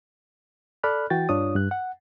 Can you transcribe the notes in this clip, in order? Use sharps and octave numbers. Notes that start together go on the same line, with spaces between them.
A4 D5 B5 F6 F#6
E3 F#4 G5 A6
G2 D4 F4 C#5 D#6
G2 F#6
F#5